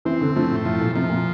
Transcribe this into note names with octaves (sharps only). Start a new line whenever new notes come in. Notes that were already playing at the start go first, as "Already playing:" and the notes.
E3 C4
D3
F3 A3
A2
A2 F3
A#2
C3 F3
A#2